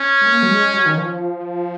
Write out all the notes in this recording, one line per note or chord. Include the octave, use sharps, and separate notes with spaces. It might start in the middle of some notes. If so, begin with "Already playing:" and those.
Already playing: C#4
G#3
A#3
F#3
G#3
F#3
D#3
F3